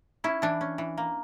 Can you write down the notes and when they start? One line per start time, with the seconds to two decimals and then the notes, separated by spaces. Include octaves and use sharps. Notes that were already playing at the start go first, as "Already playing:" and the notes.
0.24 C#4 E4
0.42 E3 D4
0.61 C#4
0.78 E3
0.98 A#3